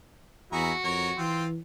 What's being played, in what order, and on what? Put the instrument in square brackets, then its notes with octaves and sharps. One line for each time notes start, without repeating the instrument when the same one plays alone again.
[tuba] E2 [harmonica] E4 G#4 A#5 [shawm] F#4
[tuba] F2 [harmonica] A#4 C#5
[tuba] E3 [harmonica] C4 F4 G5